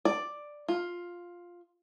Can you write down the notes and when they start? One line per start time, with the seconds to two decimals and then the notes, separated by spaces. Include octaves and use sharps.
0.05 D5
0.68 F4